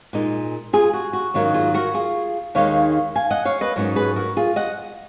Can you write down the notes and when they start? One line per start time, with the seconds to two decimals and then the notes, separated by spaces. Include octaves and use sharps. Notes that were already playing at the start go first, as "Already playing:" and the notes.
0.13 A#2 G#3 D#4
0.73 F4 G#4
0.93 F#4
1.13 F#4
1.34 G#2 D#3 F#3 A#3 C#4
1.54 F4 G#4
1.74 F#4 A#4
1.94 F4 G#4
2.55 D#2 D#3 G#3 D#4 C#5 F5
3.16 F5 G#5
3.30 D#5 F#5
3.45 C#5 F5
3.61 B4 D#5
3.76 G#2 F#3 C#4 A#4 C#5
3.96 G#4 B4
4.16 F#4 A#4
4.37 F4 G#4
4.56 D#5 F#5